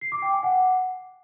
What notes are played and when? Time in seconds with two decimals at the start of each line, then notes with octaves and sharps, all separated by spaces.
0.01 C7
0.12 D6
0.22 G5
0.33 G#5
0.43 F#5